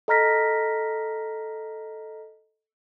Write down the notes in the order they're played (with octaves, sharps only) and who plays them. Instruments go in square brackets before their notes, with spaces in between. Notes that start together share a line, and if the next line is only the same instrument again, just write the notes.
[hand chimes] A4 D#5 A#5 F6 A#6 B6